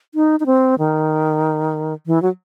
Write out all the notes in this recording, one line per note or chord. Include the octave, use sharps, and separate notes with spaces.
D#4
D#4
C4
D#3
E3
F#3